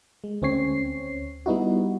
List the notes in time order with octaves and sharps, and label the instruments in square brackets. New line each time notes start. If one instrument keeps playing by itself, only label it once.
[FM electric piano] G#3
D2 C4 C#4 C#5 C7
G3 B3 D#4 E4 F#4